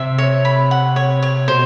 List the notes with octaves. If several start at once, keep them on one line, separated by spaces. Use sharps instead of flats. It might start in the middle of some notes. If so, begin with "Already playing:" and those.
Already playing: C3 E5
C#5
B5
F#5
C#5
C#5
B2 C5